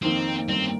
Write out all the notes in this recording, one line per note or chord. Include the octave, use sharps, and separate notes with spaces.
F2 D#3 A#3 C4 D#4
G1 G2 D#3 A#3 C4